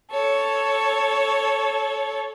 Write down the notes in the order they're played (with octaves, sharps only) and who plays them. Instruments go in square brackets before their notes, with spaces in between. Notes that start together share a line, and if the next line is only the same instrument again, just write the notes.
[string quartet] A4 C#5